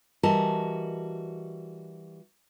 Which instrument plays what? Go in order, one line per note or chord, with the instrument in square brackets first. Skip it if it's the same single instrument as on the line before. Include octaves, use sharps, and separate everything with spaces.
[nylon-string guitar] E3 G3 F#4 A#4 D#5 A5